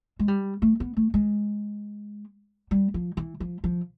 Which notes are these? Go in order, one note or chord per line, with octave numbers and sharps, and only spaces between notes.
G#3
G3
A3
B3
A3
G#3
G3
F3
E3
F3
F3